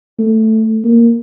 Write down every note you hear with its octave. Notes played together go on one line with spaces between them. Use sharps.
A3
A#3